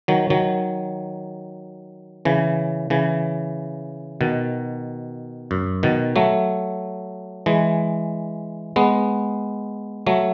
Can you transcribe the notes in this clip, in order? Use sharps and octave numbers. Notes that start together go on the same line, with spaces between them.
D#3 F#3
D#3 F#3
C#3 E3
C#3 E3
B2 D#3
F#2
B2 D#3
F#3 A3
E3 G#3
G#3 B3
F#3 A3